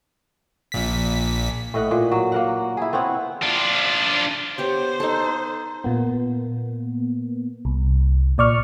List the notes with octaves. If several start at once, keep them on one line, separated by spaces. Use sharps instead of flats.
A#1 A#2 B6
A2 D#5 F#5
A#2
F#3
A#3 A#4 F#5
E4 G#4
B3 C4 C#5 F#5
D4 F4
B3 G4 C5 C#5
D#4 A4
A#2 A#3 B3
C2
A#2 D5 C#6 F6